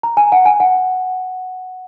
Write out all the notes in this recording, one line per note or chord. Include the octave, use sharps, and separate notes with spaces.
A#5
G#5
F#5
G#5
F#5